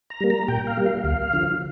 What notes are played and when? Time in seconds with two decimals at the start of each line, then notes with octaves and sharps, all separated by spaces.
0.10 A#5
0.20 G3 A#3
0.30 A#5
0.48 A#2 G5
0.67 F5
0.77 G3 A#3
0.86 F5
1.04 D2 F5
1.33 D3 F3